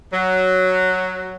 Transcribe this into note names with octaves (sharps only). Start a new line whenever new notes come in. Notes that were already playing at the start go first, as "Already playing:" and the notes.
F#3